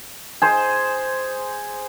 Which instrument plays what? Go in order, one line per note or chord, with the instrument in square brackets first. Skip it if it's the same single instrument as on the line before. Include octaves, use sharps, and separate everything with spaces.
[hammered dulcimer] G#4 C5